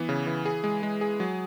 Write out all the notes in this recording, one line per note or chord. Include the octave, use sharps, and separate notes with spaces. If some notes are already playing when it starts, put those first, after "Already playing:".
Already playing: E3 B3
C#3
E3
G#4
G#3
G#3
G#4
F#3